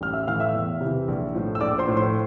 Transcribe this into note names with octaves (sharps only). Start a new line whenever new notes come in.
A1 F6
E5 E6
A2 E3 F5 F6
E5 E6
E2
C3 E3
A#1
A2 F3
E6
A#1 D5 D6
C5 C6
A2 F3
C5 C6